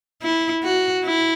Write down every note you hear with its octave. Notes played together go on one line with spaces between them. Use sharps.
E4
F#4
E4